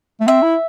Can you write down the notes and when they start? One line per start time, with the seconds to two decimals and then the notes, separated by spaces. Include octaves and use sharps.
0.20 A3
0.27 C4 E5
0.42 E4